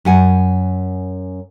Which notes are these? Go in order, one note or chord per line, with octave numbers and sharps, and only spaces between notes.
F#2 F#5 G#5